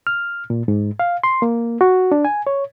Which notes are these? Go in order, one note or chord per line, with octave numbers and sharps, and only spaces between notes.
F6
A#2
G#2
F5
C6
A#3
F#4
D4
G#5
C#5